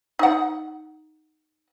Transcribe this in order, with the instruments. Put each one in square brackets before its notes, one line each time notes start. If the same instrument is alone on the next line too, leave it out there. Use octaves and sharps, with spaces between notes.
[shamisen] D#4 F#5